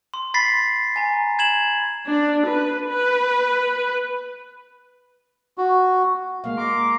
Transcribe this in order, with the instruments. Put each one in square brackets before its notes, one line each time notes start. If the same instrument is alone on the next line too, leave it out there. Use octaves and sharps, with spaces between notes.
[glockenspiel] C6
B5 A6 B6 C7
G#5 A#5
G#6 E7 F#7
[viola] D4
B4
B4
[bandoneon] F#4
[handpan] G#3 A#3 F5
[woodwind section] A#5 C6 D6